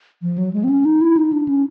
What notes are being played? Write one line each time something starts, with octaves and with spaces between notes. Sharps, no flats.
F3
F#3
G#3
C4
C#4
D#4
E4
D#4
D4
C#4